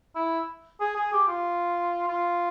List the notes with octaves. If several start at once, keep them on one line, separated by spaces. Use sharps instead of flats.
E4
G#4
G#4
G4
F4
F4